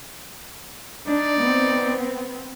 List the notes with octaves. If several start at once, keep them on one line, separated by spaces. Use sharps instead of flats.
D4 D#4 D5
B3 C4